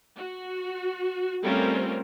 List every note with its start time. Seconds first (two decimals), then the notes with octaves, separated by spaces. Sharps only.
0.18 F#4
1.43 G3 A3 C4 C#4 F4 A#4